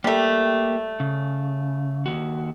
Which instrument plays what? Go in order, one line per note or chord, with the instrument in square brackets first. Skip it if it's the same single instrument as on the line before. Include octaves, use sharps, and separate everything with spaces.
[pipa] G3 A3 [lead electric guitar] A#3 G4
[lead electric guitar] C#3
D#2 F#4